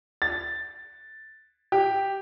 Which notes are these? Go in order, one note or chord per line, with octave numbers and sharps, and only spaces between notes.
A6
G4